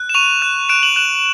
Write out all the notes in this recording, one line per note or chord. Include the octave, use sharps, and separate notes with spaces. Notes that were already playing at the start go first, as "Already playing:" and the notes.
Already playing: F#6
E7
C#6 D#7 F7
F#6
F#6 D7 E7
E7 F#7
F#6 E7 F#7